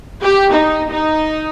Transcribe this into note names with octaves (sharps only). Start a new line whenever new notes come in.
G4
D#4
D#4